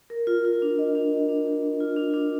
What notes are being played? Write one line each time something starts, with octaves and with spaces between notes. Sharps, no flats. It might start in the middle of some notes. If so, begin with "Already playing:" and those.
A#4
F4
F4
D4
D#5
D4
D#5
D4
A#4
D4
F4
D4
D4